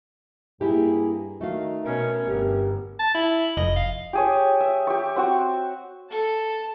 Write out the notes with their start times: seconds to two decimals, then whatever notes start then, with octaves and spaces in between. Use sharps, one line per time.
0.61 G2 A#3 E4 G4 G#4
1.41 D#3 A3 D#4 F#4 F5
1.85 B2 C#4 A#4
2.28 G1 G4
2.99 A5
3.15 E4
3.57 F1 D#5
3.76 F5
4.13 G4 G#4 C#5
4.60 E5
4.87 G4 C#6
5.16 C4 F#4 C#6
6.09 A4 A5